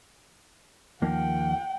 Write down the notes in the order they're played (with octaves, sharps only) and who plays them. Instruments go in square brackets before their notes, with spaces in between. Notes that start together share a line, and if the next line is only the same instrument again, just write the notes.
[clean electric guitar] D#2 F3 A#3 [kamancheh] F#5 G5